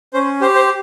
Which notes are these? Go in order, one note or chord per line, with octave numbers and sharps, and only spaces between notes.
C#4 C5
G4 C5
C5